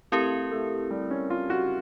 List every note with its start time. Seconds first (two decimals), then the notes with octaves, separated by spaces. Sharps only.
0.12 A3 C4 E4 G4 A#4
0.52 A3
0.90 G3
1.11 C#4
1.30 F4
1.50 F#4